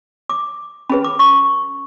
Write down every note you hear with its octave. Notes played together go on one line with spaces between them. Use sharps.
D6
C#4 G#4 B4 B5
D6
C#6